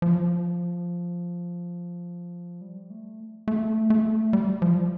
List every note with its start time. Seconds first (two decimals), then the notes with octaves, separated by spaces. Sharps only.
0.02 F3
2.61 G3
2.90 A3
3.48 A3
3.90 A3
4.33 G3
4.62 F3